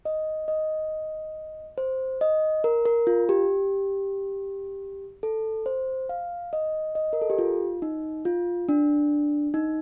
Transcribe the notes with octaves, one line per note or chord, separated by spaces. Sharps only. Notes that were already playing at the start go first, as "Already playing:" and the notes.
D#5
D#5
C5
D#5
A#4
A#4
F4
G4
A4
C5
F5
D#5
D#5
A#4
A4
G4
F4
D#4
F4
D4
D#4